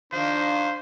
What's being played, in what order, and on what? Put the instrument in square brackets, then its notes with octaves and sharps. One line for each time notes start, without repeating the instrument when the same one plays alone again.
[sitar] D#3 F3 [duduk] D4 [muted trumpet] C5